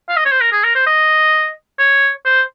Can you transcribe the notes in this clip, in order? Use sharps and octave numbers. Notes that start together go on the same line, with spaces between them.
F5
D#5
C#5
C5
A#4
G#4
A#4
C5
D#5
C#5
C5